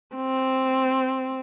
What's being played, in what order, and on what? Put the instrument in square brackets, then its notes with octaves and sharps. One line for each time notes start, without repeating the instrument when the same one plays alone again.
[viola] C4